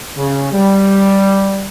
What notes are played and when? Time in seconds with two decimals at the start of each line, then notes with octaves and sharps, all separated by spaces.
0.17 C#3
0.52 G3